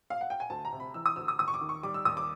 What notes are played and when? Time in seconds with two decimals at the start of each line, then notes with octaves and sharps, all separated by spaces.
0.10 F5
0.21 F#5
0.30 G5
0.40 G#5
0.50 D2 A5
0.65 A#5
0.73 C3
0.80 B5
0.94 E3 E6
1.06 D#6
1.16 D2 E6
1.28 D#6
1.39 D#2 D#6
1.48 C#6
1.54 D6
1.61 D#3
1.69 C#6
1.83 G3 D6
1.94 E6
2.05 D#2 D#6
2.17 D6